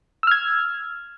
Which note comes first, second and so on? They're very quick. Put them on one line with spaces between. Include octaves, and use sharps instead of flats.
E6 F6 G#6